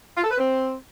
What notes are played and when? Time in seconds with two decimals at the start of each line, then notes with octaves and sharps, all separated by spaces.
0.17 F4
0.24 A4
0.31 B4
0.38 C4